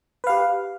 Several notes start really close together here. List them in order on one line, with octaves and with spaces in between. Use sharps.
B4 F5 G4